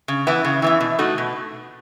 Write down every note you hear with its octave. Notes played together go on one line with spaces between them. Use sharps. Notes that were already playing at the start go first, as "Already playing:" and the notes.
C#3
E3 B3 E4
C#3
E3 B3 E4
B2
A3 D#4 F#4
B2